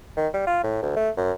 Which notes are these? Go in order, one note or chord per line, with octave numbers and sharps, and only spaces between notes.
D#3
G3
F4
A2
D2
A3
F#2